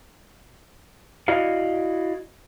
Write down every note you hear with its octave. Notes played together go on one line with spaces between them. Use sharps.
E4 F#4 D5 D#5 F5